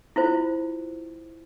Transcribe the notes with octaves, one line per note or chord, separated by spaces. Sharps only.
E4 F4 C5